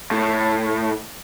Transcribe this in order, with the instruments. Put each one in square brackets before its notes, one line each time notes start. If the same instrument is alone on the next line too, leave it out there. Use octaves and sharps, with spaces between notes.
[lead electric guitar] A2